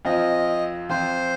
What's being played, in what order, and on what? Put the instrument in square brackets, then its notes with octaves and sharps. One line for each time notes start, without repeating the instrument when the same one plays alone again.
[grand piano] F2 F3 C4 F4 [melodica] D#5
[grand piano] F2 F3 C4 F4 [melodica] C5